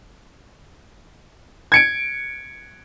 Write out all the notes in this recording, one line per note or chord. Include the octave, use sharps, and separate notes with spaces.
G#6 C#7 D7